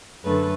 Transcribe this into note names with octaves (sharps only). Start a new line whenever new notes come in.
F#2 D3 A3 B4